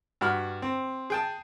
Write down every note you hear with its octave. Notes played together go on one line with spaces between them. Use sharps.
G2 F#4 B5 F6
C4
G#4 G5 A5